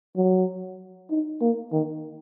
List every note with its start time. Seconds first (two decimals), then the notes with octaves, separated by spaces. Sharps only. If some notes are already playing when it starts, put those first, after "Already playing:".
0.16 F#3
1.10 D#4
1.41 A#3
1.72 D#3